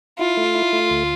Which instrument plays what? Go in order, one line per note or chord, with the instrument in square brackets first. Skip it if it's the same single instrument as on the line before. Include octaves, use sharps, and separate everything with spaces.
[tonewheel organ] E4 [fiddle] F4
[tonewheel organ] A3
E4
A3
D2